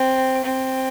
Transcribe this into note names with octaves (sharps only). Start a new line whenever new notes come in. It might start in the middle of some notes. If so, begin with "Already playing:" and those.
Already playing: C4
C4